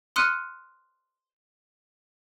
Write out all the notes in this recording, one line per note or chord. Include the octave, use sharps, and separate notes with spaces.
C6 D#6 F6 F#6 C#7 D#7